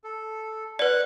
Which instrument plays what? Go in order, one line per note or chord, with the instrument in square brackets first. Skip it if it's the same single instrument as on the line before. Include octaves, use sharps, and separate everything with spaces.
[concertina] A4
[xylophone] B4 D5 [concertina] F#5 F#6